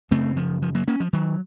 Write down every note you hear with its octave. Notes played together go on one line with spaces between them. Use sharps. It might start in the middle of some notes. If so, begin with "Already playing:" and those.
F#2 C#3 A3 C4
F3
F3
F#3 A#3
A#3 C#4
F3
D#3 F#3